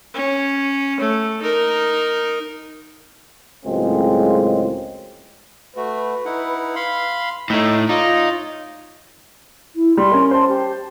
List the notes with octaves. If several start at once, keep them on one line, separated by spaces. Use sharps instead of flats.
C#4
A3
D#4 A#4
C#2 A2 F#3 G#3 A#3 C4
A3 F#4 B4
D#4 E4 F#5
F5 B5 C6
A2 A3 D#4 G5
D#4 F4 C#5 D5 D6
E4
G3 C6
C#4 A#4
C5 A5 C6
G4